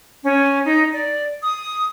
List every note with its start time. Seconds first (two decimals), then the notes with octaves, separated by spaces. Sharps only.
0.24 C#4
0.64 D#4
0.92 D5
1.41 D#6